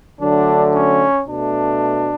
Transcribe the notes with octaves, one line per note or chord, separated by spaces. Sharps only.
D3 F#3 A3 D4
C#4
B2 A3 D4